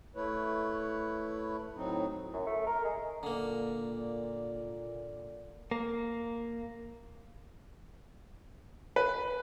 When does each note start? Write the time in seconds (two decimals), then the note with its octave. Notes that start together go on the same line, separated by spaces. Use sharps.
0.15 A3 E4 B4 C#5
1.76 A2 F#3 C4 D#4
2.33 F#2
2.46 A3
2.67 A#4
2.84 G#3
3.23 A#2 D3 A#3 D5
5.71 A#3
8.96 B4